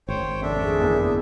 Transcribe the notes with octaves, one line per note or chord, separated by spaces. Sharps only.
G#1 C5 C#5 G5
F1 D4 E5
G#4
F#1 E2